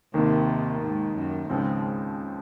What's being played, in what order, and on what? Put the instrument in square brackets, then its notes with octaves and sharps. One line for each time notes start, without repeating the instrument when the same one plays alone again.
[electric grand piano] D#2 D#3 A#3 [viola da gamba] C3
[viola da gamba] G#2
F#2
[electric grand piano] C#2 C#3 F3 C4 [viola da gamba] G#2